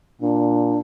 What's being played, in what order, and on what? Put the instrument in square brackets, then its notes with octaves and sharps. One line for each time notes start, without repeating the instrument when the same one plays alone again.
[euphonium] A#2 [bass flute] D4